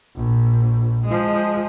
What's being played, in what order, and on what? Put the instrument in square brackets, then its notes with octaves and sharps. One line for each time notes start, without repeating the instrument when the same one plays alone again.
[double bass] A#1
F3 G#3